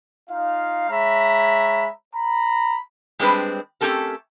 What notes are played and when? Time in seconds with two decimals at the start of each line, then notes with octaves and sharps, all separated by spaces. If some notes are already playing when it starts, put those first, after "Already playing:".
0.30 D#4 F4 F5
0.90 G#3 C#5 E5 A#5 B5
2.15 A#5 B5
3.19 G3 G#3 C4 D4 B4
3.81 A3 C4 C#4 G4 A4 A#4